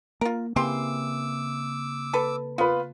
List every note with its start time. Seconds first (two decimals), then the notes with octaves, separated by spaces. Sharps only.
0.21 A#3 F4 A#4
0.56 C#3 E3 A#3 C4 G4 C6 D6 E6
2.13 A4 B4
2.58 B3 F4 B4